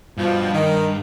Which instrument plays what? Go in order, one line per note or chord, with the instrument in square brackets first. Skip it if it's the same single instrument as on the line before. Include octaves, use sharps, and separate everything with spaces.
[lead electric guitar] G2 [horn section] B2 F3
[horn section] D#3